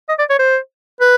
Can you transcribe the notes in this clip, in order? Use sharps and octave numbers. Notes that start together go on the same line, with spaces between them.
D#5
D5
C#5
C5
B4